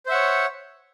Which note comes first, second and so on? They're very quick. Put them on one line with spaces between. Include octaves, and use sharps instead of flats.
C5 E5 F#5 C#5